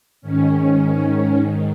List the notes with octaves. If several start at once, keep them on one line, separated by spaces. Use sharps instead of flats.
G#2 D#3 C#4